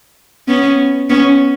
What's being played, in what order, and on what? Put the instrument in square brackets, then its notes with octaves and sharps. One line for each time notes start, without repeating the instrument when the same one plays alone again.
[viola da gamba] B3 C#4
B3 C#4